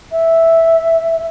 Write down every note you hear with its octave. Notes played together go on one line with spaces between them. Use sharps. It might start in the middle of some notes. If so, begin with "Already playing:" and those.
E5